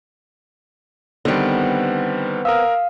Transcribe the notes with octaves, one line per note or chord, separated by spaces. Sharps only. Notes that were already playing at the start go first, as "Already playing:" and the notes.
D3 D#3 G3 B3 C4
A#4 F5 D#6 E6